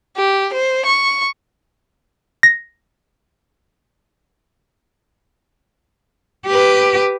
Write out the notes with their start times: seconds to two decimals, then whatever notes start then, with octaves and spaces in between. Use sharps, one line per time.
0.17 G4
0.53 C5
0.85 C#6
2.43 A#6
6.47 G4 B4